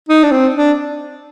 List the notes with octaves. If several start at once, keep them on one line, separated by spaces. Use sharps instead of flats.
D#4
D4
C4
D4